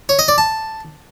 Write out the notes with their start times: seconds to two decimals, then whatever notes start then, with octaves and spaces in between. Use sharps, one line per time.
0.09 C#5
0.19 D#5
0.28 D5
0.38 A5